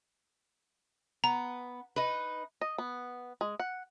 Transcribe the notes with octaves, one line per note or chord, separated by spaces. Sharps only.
B3 A#5
D#4 B4
D#5
B3
G#3
F#5